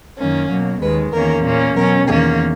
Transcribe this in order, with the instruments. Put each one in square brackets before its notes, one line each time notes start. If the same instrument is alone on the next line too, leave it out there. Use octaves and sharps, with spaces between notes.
[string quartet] F#2 D#3 A#3 C#4
B2 F#3 A#3
D#2 D#3 G#3 B4
E2 D#3 A#3 C#4 A#4
A#2 A#3 C#4
B2 F#3 C#4 A#4
E2 D#3 A#3 C#4 G#4